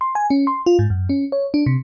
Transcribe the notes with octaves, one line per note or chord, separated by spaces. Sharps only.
C6
G#5
C#4
C6
F4
G#2
F#2
C#4
C#5
D4
C3